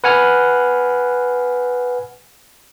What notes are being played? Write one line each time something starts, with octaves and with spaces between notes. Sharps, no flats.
B4 F#5 G#5 F6